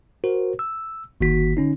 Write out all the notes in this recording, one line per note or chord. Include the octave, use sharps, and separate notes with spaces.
F#4 A#4 C5
E6
G1 D#3 A#3 F#4 B6
D3 C#4 D#4